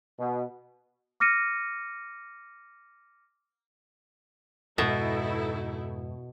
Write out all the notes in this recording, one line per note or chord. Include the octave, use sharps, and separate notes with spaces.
B2
D6 F6 A#6 C#7 D#7
F2 G#2 B2 G#3 D#4 E4 A4